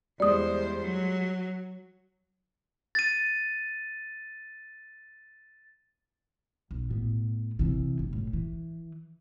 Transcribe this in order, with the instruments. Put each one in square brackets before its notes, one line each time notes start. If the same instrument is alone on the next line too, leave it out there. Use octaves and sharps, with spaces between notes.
[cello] E2 C5 [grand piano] G3 G#3 [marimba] D5 D#6
[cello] F#3
[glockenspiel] A6 D#7
[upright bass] B1
A2 B3
C3 E3
G1 D2
A2
E3